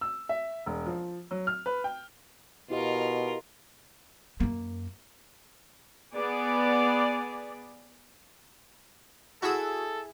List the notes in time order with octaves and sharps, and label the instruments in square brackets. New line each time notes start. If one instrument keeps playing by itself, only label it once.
[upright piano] E6
E5
E1
F3
F#3
F6
B4
G5
[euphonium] B2 [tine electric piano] E4 G4 D#5 [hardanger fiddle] F4 A#4
[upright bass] F#2 A#3
[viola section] B3 G#4 D5
[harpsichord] E4 G#4 [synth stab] F#4 E6 [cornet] A4